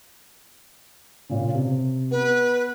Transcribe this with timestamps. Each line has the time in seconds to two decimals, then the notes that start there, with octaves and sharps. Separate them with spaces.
1.29 A#2 C#3
1.55 C3
2.11 B3 B4